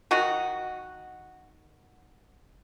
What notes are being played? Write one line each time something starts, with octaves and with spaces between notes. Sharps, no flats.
D#3 D#4 F#4